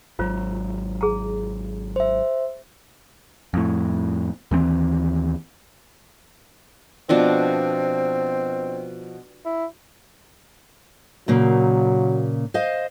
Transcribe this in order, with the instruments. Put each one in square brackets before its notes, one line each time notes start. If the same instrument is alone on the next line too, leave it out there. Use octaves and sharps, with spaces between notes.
[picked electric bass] G#1 F#3 [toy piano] F4 C5
[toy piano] G#4 A#5
[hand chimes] C5 E5
[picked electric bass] F2 A2
D#2 E3 A3 C4
[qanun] B2 F3 D4 [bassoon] C4
[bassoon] E4
[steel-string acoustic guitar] A#2 C#3 A#3 [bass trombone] F#3
[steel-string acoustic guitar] C5 D#5 F5